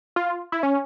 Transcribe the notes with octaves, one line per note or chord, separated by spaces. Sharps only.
F4
E4
C#4